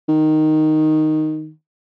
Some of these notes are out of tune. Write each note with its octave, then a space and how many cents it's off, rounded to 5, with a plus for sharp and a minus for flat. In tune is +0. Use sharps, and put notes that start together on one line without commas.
D#3 -5